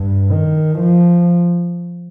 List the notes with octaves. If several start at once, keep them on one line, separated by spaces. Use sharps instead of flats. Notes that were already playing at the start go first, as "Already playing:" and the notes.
Already playing: G2
D#3
F3